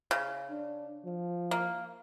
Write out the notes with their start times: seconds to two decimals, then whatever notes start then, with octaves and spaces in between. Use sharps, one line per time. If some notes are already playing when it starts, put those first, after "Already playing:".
0.11 C#3
0.50 D4
1.05 F3
1.51 A#3